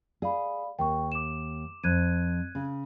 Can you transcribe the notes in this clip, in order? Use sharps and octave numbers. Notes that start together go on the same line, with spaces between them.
G#4 D5 F5 B5
D#2 G5 C#6
D6 E7
F2 F#6 G#6 D#7
C#3